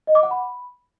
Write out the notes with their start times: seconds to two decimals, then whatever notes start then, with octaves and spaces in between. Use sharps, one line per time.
0.07 D#5
0.15 D6
0.23 F#5
0.31 B5